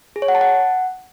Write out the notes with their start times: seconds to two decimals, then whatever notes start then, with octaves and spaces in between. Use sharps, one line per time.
0.16 G#4
0.22 C#5
0.28 F#5
0.35 A5
0.41 F#5